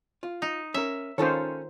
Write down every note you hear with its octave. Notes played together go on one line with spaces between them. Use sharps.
F4
D#4
C#4 A#4 E5
D#3 C#4 F4 A4 C5 C#5